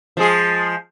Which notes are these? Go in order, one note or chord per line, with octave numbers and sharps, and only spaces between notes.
F3 G#3 G#4